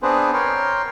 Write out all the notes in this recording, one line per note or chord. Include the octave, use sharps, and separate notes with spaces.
B3 C4 D4 G#4 B4 C5
A#4 C#5 G5 C6